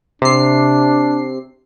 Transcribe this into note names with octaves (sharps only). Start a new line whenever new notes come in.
C3 D4 C7